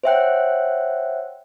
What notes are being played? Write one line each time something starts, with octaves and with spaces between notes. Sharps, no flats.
C5 C#5 E5 F#5 G5 F#6